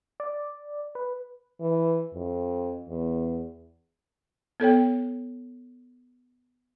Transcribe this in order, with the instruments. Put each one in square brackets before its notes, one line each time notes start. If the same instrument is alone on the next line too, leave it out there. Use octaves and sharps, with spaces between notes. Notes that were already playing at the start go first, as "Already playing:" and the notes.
[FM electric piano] D5
B4
[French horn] E3
F2
E2
[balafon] B3 A4 C#5 G5